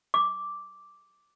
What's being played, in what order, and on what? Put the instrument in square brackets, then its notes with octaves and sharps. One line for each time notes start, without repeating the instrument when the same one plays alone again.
[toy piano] D6